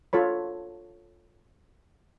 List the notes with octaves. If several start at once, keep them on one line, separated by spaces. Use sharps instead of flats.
F4 A4 C#5 B5